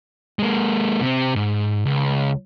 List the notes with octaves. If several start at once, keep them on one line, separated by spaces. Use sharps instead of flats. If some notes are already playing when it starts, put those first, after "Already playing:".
G#3 A#3
C3 C4
G#2
C#2